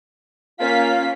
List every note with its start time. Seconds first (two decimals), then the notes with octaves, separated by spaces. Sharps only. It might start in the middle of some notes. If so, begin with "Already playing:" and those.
0.60 A#3 C#4 F4 F5 B6